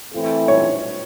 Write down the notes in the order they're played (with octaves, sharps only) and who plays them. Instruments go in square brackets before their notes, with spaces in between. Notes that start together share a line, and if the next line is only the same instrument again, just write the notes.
[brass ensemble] E3 A3 C4 E4 A4
[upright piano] C#5